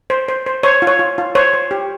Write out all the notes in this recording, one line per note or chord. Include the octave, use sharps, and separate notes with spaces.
C5
C5
C5
C5 C#5
F4
C#5
F4
F4
C5 C#5
C5
G4